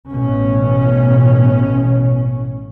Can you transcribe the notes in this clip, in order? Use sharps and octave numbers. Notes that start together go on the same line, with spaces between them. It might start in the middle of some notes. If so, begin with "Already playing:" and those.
A1 B2 C#4